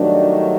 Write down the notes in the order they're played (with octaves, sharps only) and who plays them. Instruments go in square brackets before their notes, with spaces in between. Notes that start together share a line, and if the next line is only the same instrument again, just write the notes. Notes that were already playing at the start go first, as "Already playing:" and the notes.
Already playing: [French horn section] G2 D#3 F#3 A3 D4